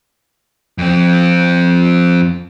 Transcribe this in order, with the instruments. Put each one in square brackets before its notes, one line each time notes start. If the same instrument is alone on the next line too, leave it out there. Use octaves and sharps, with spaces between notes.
[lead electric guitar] F2 C4